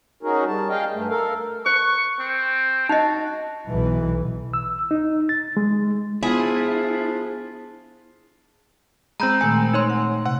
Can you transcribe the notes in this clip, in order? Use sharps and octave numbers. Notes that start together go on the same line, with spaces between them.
C#4 D#4 F#4 G#4 A#4
G3 A5
G#4 D#5 F5 G5
G2 A3
A4 A#4 F5
C5 C#6
C4
D#4 F#4 D#5
B1 E3
E6
D#4
A6
G#3
F3 B3 D4 E4 F4 G#4
G#3 C4 A#5 B5 G6
A#2 D#3 A3 G#5
D#4 C#5 C6
F#5
C3 F#5